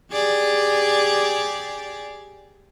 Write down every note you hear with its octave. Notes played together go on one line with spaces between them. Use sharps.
G4 G#4 D5